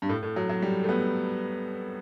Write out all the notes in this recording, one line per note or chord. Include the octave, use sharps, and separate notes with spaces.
G2
A2
A2
F#3
F#3
G3
A3
B3